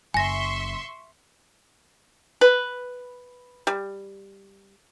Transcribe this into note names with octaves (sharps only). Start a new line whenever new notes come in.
F#1 E5 G#5 C6 C#6 A#6
B4
G3